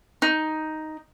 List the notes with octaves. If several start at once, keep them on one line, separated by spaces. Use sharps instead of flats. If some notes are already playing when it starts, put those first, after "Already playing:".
D#4